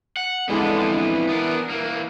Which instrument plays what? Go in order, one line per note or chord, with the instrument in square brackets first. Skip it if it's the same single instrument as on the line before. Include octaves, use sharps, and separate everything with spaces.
[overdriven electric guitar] F#5
[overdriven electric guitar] F2 B3 [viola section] D3 G#3 D4 [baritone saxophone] E3
[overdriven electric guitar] B3 D4 [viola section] A#4
[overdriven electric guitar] E3 A#3